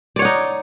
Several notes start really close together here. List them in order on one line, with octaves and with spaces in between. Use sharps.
D5 C#5 F#5 D#4